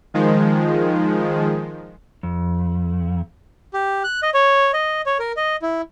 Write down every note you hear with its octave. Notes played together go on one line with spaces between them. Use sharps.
D#3 F3 G#3
F2
G4
F#6
D#5
C#5
D#5
C#5
A#4
D#5
E4